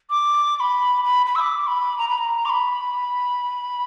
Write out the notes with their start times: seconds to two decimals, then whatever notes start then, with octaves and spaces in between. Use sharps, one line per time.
0.10 D6
0.56 D6
0.60 B5
1.04 B5
1.26 B5
1.35 E6
1.40 D6
1.67 B5
1.98 A#5
2.09 B5
2.18 A#5
2.45 D6
2.50 B5